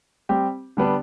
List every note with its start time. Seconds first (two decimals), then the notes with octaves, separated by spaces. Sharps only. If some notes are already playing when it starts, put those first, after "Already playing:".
0.29 G3 C4 G4
0.77 D3 G3 B3 D4